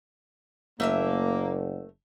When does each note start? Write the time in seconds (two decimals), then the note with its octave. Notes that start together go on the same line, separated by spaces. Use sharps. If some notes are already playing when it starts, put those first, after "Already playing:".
0.80 F#1 A3 A#3 A#4 E5